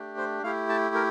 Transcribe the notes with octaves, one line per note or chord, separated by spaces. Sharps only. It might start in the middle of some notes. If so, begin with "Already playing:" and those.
Already playing: A3 D4 G4
C5
A3 E4 G4 F5
A5
A#4